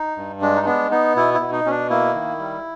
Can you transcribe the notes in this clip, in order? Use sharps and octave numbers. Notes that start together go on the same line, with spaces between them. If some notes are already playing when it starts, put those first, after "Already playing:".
Already playing: D#4
G2
G#3 D4
D#4
B3 D4
B3 D#4
B2 E4
E4
B2
D#4
B2 C#4
D4
A#3 E4
D#3
G3